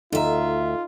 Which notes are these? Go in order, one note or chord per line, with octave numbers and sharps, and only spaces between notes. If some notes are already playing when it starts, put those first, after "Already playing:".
D2 D#4 F4 A4 E5 A#5